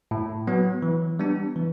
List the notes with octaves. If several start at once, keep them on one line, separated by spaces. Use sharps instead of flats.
A2
F#3 B3
E3
G3 B3 D4
E3